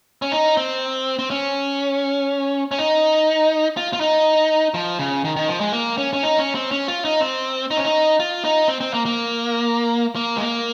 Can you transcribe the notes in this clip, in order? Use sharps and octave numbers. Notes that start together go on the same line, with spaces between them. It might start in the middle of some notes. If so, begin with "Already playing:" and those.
C#4
D#4
C4
C4
C#4
C#4
D#4
F4
F4
D#4
F3
C#3
D#3
D#3
F3
G#3
A#3
C#4
C#4
D#4
C#4
C4
C#4
F4
D#4
C4
D#4
C#4
D#4
F4
D#4
C4
C4
A#3
A#3
A#3
G#3
A#3